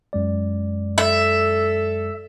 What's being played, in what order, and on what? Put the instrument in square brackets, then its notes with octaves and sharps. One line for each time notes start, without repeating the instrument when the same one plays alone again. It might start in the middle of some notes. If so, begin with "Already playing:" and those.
[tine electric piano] F#2 G#3 D5
[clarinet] A4 [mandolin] E5